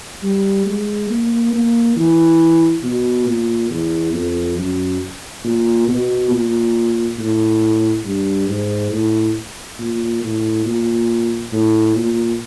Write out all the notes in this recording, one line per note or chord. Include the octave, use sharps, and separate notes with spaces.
G3
G#3
A#3
A#3
E3
B2
A#2
E2
F2
F#2
A#2
B2
A#2
A2
G2
G#2
A2
A#2
A2
A#2
A2
A#2